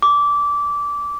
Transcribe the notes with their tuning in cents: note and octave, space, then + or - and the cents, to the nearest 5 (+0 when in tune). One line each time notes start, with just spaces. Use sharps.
D6 -20